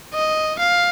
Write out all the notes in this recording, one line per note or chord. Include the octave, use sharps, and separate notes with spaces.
D#5
F5